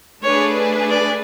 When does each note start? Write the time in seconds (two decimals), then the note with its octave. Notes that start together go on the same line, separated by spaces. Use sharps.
0.23 A3 D4 G#4 B4 C#5
0.90 D5